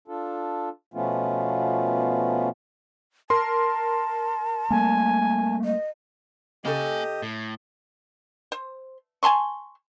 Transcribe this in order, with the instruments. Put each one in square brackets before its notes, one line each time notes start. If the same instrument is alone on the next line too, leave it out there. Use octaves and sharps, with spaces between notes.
[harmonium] D4 F4 A4
B2 F3 A3 B3 C#4 F4
[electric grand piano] A#4 C6 [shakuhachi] A5
[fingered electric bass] G3 A3 A#3 [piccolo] G#5
[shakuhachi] D#5
[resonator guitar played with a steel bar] C#3 A4 [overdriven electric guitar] A#3 G#5 [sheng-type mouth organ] G4 D#5
[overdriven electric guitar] A2
[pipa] C5
G#5 A5 C6 C#6